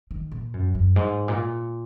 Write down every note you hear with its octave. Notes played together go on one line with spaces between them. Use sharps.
D#3
A#2
F#2
F#2
G#2
A#2